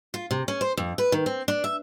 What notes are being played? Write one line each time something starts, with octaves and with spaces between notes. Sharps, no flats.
F4
C3
C#4
C5
F2
B4
D#3
C4
D4
E5